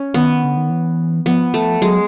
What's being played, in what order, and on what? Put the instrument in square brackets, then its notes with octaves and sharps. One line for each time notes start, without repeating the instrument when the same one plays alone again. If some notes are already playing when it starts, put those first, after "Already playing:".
Already playing: [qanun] C#4
[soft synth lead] D#3 [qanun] B3
[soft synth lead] D3
D#3
E3
[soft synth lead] F3 [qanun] B3
[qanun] A3
[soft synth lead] F#3 [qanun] G#3